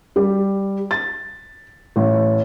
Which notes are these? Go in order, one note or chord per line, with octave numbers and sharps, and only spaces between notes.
G3
A6
A1